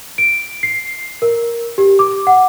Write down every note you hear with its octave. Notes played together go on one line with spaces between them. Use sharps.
D7
C7
A#4
G4
D6
F#5